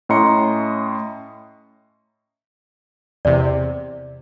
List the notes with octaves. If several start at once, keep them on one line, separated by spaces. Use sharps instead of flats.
A2 C#4 D#5 A#5 C6 C#7
E2 C3 D5